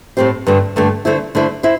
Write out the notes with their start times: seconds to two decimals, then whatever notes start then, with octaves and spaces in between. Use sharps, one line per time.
0.17 A2 A3 C4 G4 C5
0.47 G2 D3 A3
0.76 G2 D3 A3
1.05 D3 A3 E4 C5
1.35 D3 A3 E4 C5
1.63 E4 C5